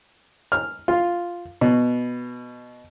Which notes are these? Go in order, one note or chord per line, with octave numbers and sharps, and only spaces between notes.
F6
F4
B2